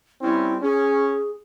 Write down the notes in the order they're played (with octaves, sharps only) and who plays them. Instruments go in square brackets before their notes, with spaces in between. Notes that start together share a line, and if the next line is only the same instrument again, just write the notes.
[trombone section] G3 C4 C#4 [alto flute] E4
[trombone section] C#4 [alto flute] G#4